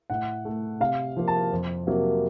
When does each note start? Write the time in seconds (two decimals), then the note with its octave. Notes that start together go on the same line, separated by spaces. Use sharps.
0.10 A2 F#5
0.45 A3
0.80 C3 F5
1.17 F3 A#3
1.28 A5
1.52 F2
1.87 C3 F#3 A#3